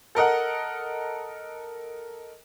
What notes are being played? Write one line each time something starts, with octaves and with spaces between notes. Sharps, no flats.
A4 A#4 D#5 F#5